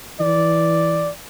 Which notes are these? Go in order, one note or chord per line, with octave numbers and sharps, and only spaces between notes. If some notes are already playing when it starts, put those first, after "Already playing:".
E3 D5